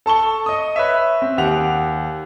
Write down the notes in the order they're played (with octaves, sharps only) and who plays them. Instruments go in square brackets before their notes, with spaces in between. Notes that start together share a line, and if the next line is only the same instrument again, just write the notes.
[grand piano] A4 A5 C#6 G7
D#5 D#6
B4 C#5 E5
C4
D#2 G4 F#5 F7